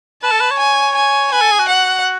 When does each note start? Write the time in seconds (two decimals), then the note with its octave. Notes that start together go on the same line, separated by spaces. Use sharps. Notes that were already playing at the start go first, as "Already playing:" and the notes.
0.23 B4 A5
0.31 A4
0.41 B4
0.51 C#5
0.59 G#5
0.95 G#5
1.32 B4 G#5
1.41 A4
1.51 G#4
1.59 F#4
1.68 F#5